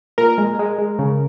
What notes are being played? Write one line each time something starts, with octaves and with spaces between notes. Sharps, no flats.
A#2 A#4
G#3
G#3
G#3
C#3